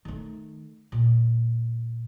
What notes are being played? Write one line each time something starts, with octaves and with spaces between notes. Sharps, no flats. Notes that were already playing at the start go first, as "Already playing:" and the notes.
D#3 A3
A#2